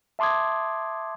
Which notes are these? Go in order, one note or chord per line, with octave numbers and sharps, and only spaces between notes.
E5 A5 C6 D6 D#6 G#6